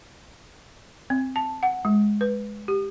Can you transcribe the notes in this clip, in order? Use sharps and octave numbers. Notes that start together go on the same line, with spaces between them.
C4
A5
F#5
G#3
B4
G4